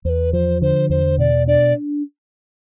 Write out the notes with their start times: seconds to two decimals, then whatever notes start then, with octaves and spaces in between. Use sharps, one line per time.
0.05 E2 C5
0.09 B4
0.33 F3 C5
0.62 D3 C5
0.90 E2 C5
1.18 B2 D5
1.47 D4 D5